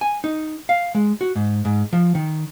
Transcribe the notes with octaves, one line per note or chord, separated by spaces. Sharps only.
G#5
D#4
F5
G#3
F#4
G#2
G#2
F3
D#3